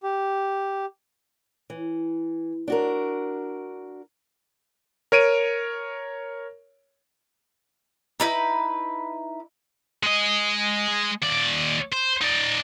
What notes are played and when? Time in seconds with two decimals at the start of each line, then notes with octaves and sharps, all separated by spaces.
0.03 G4
1.70 E3
2.68 D4 F#4 A#4
5.12 A#4 C#5 D7 D#7
8.20 D#4 E4 B4
10.03 G#3 D#5
11.22 D#2 D5
11.92 C5
12.21 D#4 D5